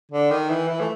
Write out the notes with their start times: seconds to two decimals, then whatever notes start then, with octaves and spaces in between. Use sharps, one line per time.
0.12 D3
0.31 D#3
0.50 E3
0.69 E3
0.80 A3